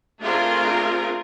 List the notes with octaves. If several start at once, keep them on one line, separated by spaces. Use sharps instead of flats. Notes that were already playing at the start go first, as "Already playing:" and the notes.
A3 C4 D4 F4 G#4 A#4